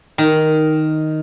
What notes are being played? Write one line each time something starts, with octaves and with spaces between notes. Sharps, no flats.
D#3